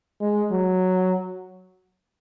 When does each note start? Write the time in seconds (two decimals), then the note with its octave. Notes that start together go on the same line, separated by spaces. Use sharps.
0.21 G#3
0.52 F#3